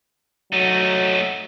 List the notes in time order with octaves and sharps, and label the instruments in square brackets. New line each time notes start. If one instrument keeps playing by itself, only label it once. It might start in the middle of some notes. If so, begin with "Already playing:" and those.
[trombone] F#3 [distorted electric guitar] A3 D#4